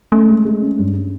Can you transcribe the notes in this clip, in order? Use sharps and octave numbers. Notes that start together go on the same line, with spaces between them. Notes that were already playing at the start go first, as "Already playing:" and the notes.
A3 C#4
G#3
G#3
C#4
G2